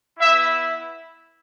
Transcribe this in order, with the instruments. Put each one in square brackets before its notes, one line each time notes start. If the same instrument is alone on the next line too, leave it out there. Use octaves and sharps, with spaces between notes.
[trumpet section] B3 E4 E5